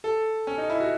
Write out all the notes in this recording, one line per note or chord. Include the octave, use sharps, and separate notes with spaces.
A4
C#4
D#4
E4
F#4